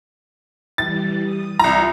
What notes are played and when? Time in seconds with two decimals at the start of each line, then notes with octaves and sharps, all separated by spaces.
0.78 E3 G3 A6
1.23 D#6
1.59 C2 F4 A#5